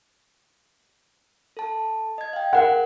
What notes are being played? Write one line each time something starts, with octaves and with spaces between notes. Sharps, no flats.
A4 A5
D#5 G#6
F5 G5
G#4 A#4 F#5 F#6